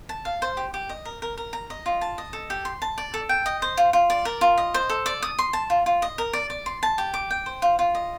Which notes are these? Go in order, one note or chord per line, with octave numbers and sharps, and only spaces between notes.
A5
F5
C5
G4
G4
D#5
A#4
A#4
A#4
A#5
D#5
F4
A5
D#5
A4
G4
C6
A5
D5
A4
G5
D#5
C5
F4
F4
D5
A#4
F4
D#5
C5
A4
D5
D#6
C6
A5
F4
F4
D#5
A#4
D5
D5
C6
A5
G4
D6
G5
C5
F4
F4
D#5